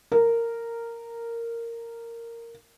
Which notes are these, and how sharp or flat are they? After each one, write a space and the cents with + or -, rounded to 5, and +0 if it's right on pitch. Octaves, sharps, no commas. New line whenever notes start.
A#4 -10